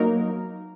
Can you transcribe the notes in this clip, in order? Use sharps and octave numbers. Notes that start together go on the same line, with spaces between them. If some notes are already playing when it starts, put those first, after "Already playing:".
Already playing: F#3 A#3 D#4 A#4